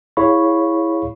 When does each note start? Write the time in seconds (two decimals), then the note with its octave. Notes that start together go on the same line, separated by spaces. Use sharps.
0.17 E4 G#4 C#5 F5 B5 C#6